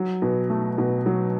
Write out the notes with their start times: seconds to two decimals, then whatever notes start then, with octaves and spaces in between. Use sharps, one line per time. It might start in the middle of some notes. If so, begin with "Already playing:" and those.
Already playing: F#3
0.22 B2
0.50 A3
0.78 B2
1.06 F#3